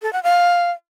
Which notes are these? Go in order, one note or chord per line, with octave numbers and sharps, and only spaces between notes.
A4
F#5
F5